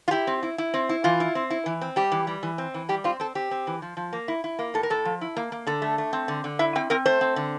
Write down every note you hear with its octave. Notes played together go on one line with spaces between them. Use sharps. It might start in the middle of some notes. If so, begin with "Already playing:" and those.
F4
E4 G4
C4
E4
E4
C4
E4
E3 F4
E4
C4
E4
E3
C4
G3 G4
E3
G3
E3
C4
E3
G3 G4
C4 F4
C4 A4
C4 G4
C4
E3
F3
F3
A#3
E4
E4
A#3
A2 A4
A#4
A2 A4
F3
E4
A#3
A#3
D3 A4
A3
A3
C4
D3
D3
E4 E5
C4 G5
C4 A#4
A3 C5
C4
D3